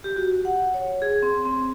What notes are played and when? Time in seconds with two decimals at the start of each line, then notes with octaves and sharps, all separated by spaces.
0.04 G4
0.16 F#4
0.45 F#5
0.74 C#5
1.02 G#4
1.22 C4
1.45 C4